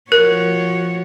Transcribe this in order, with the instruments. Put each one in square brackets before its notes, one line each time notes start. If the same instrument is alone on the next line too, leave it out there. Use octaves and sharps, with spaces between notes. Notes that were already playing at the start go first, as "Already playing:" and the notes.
[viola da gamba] F3 F#4 C#5 [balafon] A#4